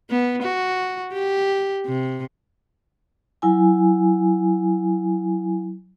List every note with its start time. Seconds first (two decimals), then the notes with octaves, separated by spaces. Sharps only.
0.10 B3
0.43 F#4
1.13 G4
1.86 C3
3.42 F#3 E4 G#5